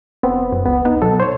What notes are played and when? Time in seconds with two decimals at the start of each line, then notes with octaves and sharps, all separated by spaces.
0.23 F1 B3 C4
0.52 F#2
0.66 C#2 B3
0.85 B3 D#4
1.02 B2 F#3 A4
1.20 C5 C#5